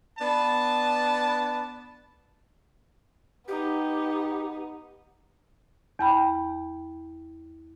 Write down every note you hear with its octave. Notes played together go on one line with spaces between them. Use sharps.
B3 D4 A5
B3 D#4 G4
E2 G5 B5